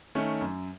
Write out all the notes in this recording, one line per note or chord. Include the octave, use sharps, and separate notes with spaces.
D#3 A3 C#4
F#2